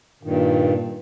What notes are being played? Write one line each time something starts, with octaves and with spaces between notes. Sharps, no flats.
G2 A#2 D#3